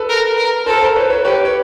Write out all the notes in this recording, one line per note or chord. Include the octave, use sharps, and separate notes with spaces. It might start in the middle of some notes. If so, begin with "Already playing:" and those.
Already playing: A4 B4
A#4
A#4
A4 A#4 C5
A#4 C5
B4 C#5
B4 C#5
G4 B4 C#5
C#5